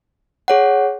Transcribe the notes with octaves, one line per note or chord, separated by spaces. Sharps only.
G#4 C#5 F#5